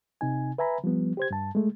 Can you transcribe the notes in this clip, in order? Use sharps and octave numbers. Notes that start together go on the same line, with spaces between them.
C3 D#4 G#5
B4 E5 G#5 A#5 B5
F3 G3 B3
G4 C5 G#6
G2 A5
G#3 A3